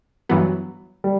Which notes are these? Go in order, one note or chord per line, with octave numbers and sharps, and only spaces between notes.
G2 E3 F#3 B3
G3